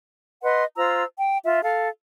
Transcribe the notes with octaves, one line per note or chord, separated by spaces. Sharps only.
B4 D#5 F#5 C6
F4 C5 A#5 E6
G5
F4 E5
A4 F5